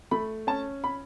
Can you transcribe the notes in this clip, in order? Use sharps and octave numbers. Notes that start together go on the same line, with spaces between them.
A3 B5
C#4 A5
B5